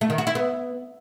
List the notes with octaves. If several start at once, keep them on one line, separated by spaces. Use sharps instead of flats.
A3
D#3
F#4
E4
B3